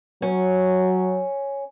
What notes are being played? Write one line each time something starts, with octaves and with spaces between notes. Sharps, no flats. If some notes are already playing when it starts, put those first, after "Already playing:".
F#3 C#4